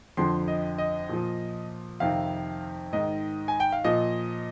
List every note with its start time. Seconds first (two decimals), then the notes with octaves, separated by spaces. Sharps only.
0.17 F2 D3 F3 C6
0.48 D#5
0.78 D#5
1.09 A#2 F3
2.00 F2 C3 D#3 F5
2.93 G#2 D#3 D#5
3.48 G#5
3.60 G5
3.73 F5
3.84 A#2 F3 D#5